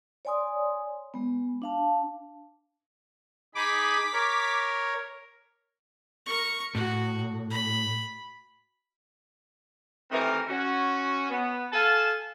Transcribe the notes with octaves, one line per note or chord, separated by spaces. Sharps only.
C#5 D5 G#5 C6 D#6
G#3 B3
D4 F5 A5
D#4 G#4 B5 D6 B6
A#4 C#5
A#4 C#6
A2 F#4
B5
D#3 E3 A3 C4 G4 A#4
C#4 F#4
B3
A4 F5 G#5 A5